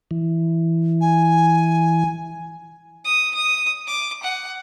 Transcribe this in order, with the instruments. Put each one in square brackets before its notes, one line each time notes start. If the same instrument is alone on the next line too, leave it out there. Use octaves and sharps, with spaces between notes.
[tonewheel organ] E3
[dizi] G#5
[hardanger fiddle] D#6
D#6
D6
F#5